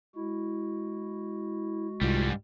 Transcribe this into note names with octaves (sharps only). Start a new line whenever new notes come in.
G#3 E4 F#4
C2 G#2 G3 F4